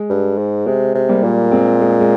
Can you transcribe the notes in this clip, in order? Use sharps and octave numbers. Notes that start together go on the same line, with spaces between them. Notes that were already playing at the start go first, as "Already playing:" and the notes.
Already playing: G#3
G2
G#2
C3 G#3
C3
G3 A#3
A#2
G#3 C4
G#3
G#3